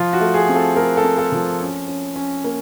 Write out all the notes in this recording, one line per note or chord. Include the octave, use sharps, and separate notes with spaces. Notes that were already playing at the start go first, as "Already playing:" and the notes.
Already playing: F3 F4
F#4
A3
G#4
C4
A4
A3 A#4
A4
C4
A4
F3
C#4
C#4
C#4
A#3